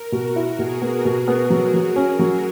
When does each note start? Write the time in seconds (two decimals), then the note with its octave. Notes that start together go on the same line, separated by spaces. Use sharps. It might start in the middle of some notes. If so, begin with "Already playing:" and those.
Already playing: A#4
0.12 B2 F#4
0.36 E4
0.58 B2 G#4
0.82 B3
1.05 B2
1.28 B3
1.50 F#3
1.74 F#3
1.96 C#4
2.19 F#3